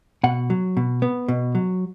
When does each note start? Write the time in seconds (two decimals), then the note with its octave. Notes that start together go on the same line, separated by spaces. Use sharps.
0.24 B2 F#5
0.50 F#3
0.77 B2
1.02 B3
1.28 B2
1.55 F#3